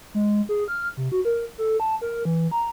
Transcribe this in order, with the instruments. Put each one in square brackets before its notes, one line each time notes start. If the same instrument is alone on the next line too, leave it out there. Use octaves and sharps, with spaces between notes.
[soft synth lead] G#3
G#4
F6
C3
F#4
A#4
A4
A5
A#4
E3
A#5